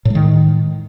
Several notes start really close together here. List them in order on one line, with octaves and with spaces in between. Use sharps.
A2 G#3 D#3